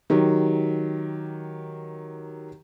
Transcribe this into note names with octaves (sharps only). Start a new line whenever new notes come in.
D#3 F#3 G4